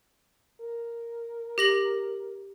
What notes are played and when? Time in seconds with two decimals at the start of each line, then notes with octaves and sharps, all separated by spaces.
0.61 A#4
1.58 G4 A#6 F#7